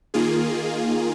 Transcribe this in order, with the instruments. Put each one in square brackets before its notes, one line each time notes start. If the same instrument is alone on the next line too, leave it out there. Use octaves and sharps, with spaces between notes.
[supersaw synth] D#3 A#3 F4 G#4